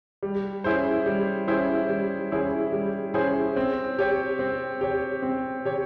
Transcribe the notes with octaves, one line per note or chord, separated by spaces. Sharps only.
G3
C#4 E4 G#4 C5
G3
C#4 E4 G#4 C5
G3
C#4 E4 G#4 C5
G3
C#4 E4 G#4 C5
C4
G4 C#5
C4
G4 C#5
C4
G4 C#5